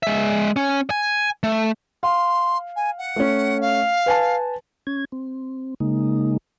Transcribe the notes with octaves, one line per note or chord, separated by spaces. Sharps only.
G#3 E5
C#4
G#5
A3
F5 C6
G#5
F#5
A3 C#4
F5
B4 G#5 A5
C#4 G#6
C4
C#3 G#3 A#3 D#4